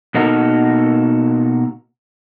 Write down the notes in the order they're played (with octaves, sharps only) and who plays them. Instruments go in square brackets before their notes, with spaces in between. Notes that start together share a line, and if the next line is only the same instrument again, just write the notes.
[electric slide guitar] B2 A#3 D#4 F#4 A4 A#4